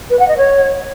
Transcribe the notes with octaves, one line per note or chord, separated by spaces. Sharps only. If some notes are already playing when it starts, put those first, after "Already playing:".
B4
F#5
D#5
C#5